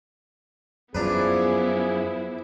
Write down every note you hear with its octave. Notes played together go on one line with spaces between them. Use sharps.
F#2 F3 B3 D4 E4 G#4 B4